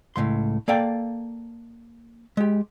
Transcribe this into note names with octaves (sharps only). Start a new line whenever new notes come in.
C#2 A2 C#3 C6
A#3 A4 D5 F5 G5
G#3 G4